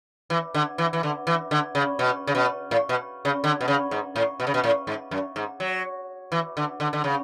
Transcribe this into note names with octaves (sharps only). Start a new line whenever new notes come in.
E3
D3
E3
E3
D3
E3
D3
C#3
B2
C#3
B2
A2
B2
C#3
D3
B2
C#3
G#2
A2
B2
C#3
B2
A2
G#2
F#2
G#2
F#3
E3
D3
D3
D3
C#3